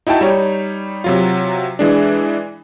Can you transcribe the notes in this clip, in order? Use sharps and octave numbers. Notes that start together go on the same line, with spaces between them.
D#4 E4 F#4 G5 A5
G3 D#4 C#5
C3 F#3 F4
E3 G#3 D4